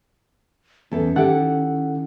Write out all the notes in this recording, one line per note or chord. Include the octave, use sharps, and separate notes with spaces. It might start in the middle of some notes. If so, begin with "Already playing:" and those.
E2 C#4 A4
D#3 E4 G4 A4 F#5